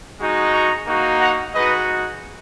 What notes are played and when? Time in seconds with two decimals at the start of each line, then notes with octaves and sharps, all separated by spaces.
0.19 G#3 D#4 F#4
0.53 A#5 C#6
0.86 A#3 D#4 F#4
1.20 F#5 A#5
1.53 G#3 D#4 F#4 B4 D#5